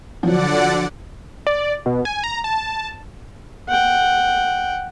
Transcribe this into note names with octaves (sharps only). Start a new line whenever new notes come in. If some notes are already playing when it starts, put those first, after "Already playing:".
D3 F3 F#3 D5 F#5
D5
B2
G#5
A#5
A5
F#5 G5